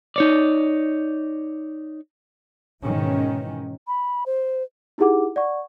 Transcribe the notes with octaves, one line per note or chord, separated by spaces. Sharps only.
D#4 C#5 D5
G#2 B2 D#3 E3 C#4
B5
C5
D#4 E4 G4 G#4 F#5 D6
D5 F#5 C#6